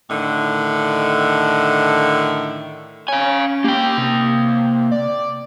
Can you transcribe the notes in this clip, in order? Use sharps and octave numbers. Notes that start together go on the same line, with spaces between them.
A2 D3 D#3
C#4 F5 G#5
A#3 G4 G5
C3
D5